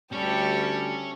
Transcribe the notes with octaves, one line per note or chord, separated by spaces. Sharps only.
D2 G3 C#4 G4 A4